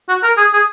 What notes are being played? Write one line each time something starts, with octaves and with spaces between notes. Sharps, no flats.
F#4
A#4
G#4
G#4